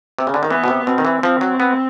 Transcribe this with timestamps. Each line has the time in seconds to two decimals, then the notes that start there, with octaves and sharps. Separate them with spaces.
0.19 C3
0.27 C#3
0.34 D3
0.43 D#3
0.50 E3 B3
0.64 B2
0.68 C3
0.86 B2 C4
0.98 D#3
1.05 E3
1.23 F3 C4
1.41 F#3
1.60 B3